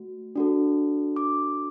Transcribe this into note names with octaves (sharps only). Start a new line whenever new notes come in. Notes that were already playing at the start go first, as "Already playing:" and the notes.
Already playing: A3 F#4
D4 F#4 A4
D6